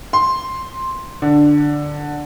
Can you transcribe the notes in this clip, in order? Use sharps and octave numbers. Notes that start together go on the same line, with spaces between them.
C6
D3